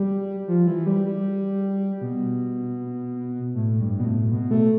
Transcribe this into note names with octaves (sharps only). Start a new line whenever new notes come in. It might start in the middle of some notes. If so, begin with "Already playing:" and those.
Already playing: G3
F3
E3
G3
G3
B2
A2
G2
B2
A2
B2
A3